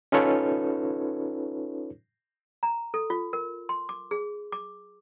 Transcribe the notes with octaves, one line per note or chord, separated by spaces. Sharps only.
C#4 D#4 F4 A4 B4 C#5
A#5
A4
F4
A#4
C6
D6
G#4
D6